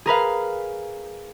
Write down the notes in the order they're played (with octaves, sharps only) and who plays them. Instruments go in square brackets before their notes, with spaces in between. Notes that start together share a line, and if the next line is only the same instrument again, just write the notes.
[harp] G#4 A#4 B4 F5